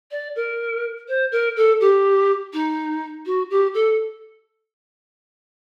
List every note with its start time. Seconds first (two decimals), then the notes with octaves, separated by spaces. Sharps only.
0.11 D5
0.36 A#4
1.08 C5
1.32 A#4
1.56 A4
1.80 G4
2.53 D#4
3.26 F#4
3.50 G4
3.74 A4